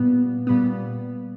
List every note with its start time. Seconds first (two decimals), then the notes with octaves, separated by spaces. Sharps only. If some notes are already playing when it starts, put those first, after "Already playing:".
Already playing: A#2 G3 B3
0.47 A#2 G3 B3